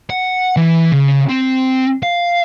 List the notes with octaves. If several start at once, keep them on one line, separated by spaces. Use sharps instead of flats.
F#5
E3
C#3
C4
F5